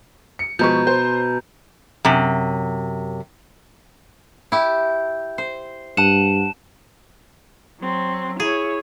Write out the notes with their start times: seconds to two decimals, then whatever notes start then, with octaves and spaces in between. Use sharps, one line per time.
0.39 C#7
0.59 B2 F3 G#3 B4 A#5 C#6 G6
0.87 C5 G6
2.05 F#2 C3
4.52 E4 G4
5.38 C5
5.97 G2 F#5 A5 E7
7.80 F#3 C4
8.40 E4 G#4 C#5